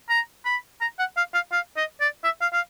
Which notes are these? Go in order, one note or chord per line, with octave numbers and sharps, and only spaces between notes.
A#5
B5
A#5
F#5
F5
F5
F5
D#5
D5
E5
F5
F5